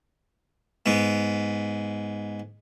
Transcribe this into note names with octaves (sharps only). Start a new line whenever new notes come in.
G#2 B3